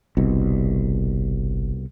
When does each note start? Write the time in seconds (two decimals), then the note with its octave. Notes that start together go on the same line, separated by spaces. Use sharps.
0.17 G1 C2 B2